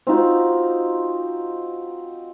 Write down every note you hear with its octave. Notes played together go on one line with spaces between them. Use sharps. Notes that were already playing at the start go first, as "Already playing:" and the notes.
C4 D#4 F4 F#4